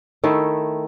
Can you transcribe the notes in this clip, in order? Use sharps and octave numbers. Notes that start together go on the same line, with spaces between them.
D#3 A3 E4